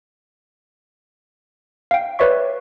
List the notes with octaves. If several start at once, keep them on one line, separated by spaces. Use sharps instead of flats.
F5 G5
B4 C#5 D5 E5 C#6